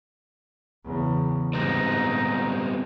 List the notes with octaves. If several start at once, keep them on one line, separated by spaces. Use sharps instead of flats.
E2 C#3
G#2 G3 B3 C4 D#4